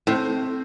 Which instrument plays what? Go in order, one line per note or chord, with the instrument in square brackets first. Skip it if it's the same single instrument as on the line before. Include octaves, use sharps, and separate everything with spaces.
[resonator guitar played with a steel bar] A2 [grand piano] C4